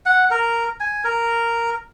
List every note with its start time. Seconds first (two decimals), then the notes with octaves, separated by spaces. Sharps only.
0.06 F#5
0.31 A#4
0.80 G#5
1.04 A#4